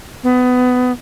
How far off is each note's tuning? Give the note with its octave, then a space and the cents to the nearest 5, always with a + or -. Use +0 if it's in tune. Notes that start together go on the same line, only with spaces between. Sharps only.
B3 +20